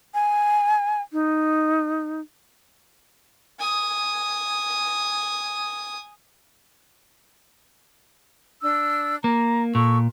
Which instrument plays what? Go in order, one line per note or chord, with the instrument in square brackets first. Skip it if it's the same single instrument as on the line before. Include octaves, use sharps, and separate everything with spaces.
[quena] G#5
D#4
[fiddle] G#5 D#6
[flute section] D4 E6
[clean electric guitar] A#3 [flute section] A#5
[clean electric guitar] A#2 [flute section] A4 C#6 E6